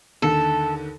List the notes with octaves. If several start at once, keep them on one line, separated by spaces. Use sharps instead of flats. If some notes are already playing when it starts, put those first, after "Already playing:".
D#2 D3 A4